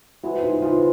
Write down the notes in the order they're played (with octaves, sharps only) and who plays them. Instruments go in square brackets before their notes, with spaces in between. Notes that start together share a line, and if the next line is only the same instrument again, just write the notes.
[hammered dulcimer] C3 E3 G#3 [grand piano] E4 F#4
[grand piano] D#4 F4
[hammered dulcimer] C3 E3 G#3 [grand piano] D#4 F4